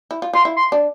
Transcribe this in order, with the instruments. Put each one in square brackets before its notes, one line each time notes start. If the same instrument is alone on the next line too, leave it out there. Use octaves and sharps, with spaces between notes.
[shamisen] E4
F4
[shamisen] F4 [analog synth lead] C6
[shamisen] E4
[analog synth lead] C6
[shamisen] D4